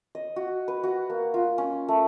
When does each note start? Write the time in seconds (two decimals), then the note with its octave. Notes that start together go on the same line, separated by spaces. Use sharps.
0.15 D#5
0.36 F#4
0.68 B4
0.84 F#4
1.10 A#3
1.34 F4
1.58 C#4
1.88 A3